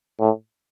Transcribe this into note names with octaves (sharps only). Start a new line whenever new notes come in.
A2